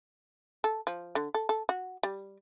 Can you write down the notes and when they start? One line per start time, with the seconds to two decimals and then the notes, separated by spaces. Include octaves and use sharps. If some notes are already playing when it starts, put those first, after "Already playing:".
0.64 A4
0.87 F3
1.15 D3
1.34 A4
1.49 A4
1.69 F#4
2.03 G3